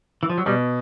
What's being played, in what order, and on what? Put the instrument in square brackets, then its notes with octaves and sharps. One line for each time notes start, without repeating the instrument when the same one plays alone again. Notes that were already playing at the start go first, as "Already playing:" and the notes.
[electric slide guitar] E3
F3
F#3
[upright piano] B2 [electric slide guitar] G3